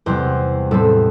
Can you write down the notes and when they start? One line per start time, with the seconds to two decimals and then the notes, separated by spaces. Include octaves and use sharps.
0.06 E2 C3 G3 C4 C5
0.71 A2 G3 C4 A4